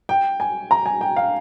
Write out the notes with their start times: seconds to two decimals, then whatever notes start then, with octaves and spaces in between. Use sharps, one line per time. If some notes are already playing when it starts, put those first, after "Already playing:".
0.09 G5
0.40 G#5
0.71 A#5
0.86 G#5
1.01 G5
1.16 F5